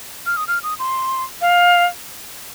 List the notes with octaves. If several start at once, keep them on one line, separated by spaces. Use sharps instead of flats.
F6
D#6
F6
D#6
C6
F5